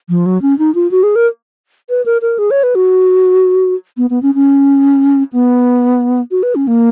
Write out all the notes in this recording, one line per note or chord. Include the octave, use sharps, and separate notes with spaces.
F3
F#3
C#4
D#4
F4
F#4
G#4
A#4
B4
A#4
A#4
G#4
C#5
B4
F#4
B3
B3
C#4
C#4
B3
F#4
B4
C#4
A#3